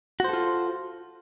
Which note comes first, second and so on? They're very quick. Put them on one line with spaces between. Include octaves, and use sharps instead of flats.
F#4 C5 A4 F4